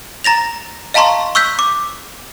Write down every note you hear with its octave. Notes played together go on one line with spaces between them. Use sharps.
A#5 A6 A#6 F7
D#5 F5 A5 A#5 C6 C#6
C#6 E6 F#6 G6 B6
D6